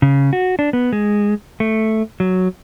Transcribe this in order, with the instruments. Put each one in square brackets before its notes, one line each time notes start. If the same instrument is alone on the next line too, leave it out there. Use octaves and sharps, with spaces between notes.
[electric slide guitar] C#3
F#4
D4
B3
G#3
A3
F#3